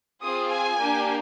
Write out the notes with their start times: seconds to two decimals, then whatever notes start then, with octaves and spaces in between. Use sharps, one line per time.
0.22 C4 F4 G#4 D#6
0.50 G#5
0.78 A#3 D4 G4